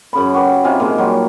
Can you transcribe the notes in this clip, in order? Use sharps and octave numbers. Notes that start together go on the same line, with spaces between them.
F#2 C#3 B5
F#4 G4 B4
C3 D#4 F4 G#5
A#2 G#3 F4
F#3 G3